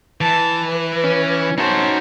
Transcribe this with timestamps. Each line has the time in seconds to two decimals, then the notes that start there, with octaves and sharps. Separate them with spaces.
0.21 E3 A5
0.70 B4
1.04 C#4
1.58 C#4 D#4 F#4 C5 A5